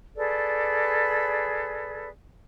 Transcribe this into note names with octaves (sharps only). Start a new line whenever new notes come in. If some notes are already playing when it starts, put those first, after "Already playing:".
G#4 A4 B4 D5